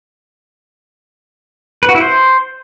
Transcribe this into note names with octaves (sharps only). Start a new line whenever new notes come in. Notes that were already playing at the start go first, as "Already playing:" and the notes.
B4
F#4
E4
C5